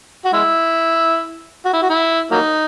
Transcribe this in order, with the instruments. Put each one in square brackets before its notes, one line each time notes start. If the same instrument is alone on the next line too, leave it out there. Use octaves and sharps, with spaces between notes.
[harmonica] F#4
G#3 E4
F#4
E4
F#4
E4
F#3 A#3 D#4